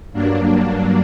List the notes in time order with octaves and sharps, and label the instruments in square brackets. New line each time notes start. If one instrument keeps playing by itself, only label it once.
[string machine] G2 F#3 A#3 D4
D4